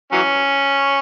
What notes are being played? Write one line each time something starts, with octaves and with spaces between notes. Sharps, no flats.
E3 F#3 C#4